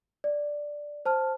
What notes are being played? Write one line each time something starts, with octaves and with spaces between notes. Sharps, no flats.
D5
C5 A5 F6